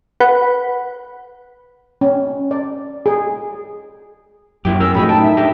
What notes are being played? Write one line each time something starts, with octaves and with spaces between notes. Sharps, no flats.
B4 F#5 B5
C#4
D5
G#4
F#2 A#2 F#3 E4 G4
G#2 C#4 A#4 G5 E6
F2 A2 G#3 D#4 F#4 B5
D#4 G5 A5
E5
D4 G4 A#4